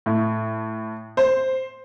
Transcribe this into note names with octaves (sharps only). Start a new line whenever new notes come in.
A2
C5